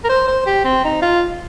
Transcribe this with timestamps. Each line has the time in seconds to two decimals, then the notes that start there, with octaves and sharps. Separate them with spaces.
0.04 A#4
0.09 C5
0.28 C5
0.46 G4
0.64 C4
0.84 D#4
1.02 F4